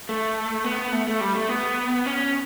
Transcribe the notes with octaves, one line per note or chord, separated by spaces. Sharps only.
A3
B3
A3
A3
G3
A3
B3
C#4